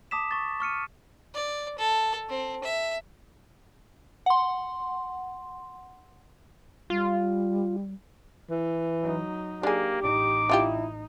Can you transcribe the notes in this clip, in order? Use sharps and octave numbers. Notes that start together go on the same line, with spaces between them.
A5 D6 D#6 B6 E7
C#6 A6
C#6 F6 C#7 D#7
D5
A4
C4
E5
F#5 C6
G3 F4
E3
F#3 D#4
A#3 D4 G4 G#4
A1 D#4 D6
D4 E4 F4 G4